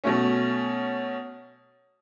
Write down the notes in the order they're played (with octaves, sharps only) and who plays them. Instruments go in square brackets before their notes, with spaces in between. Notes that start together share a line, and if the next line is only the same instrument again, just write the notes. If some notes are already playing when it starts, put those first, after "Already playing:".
[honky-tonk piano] B2 F#3 A3 C#4